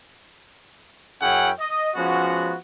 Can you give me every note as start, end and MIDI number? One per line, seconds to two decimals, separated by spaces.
1.22 1.51 42
1.22 1.51 61
1.22 1.51 64
1.22 1.51 68
1.22 1.51 78
1.22 1.51 79
1.60 1.91 75
1.96 2.55 53
1.96 2.55 56
1.96 2.55 59
1.96 2.55 61
1.96 2.55 66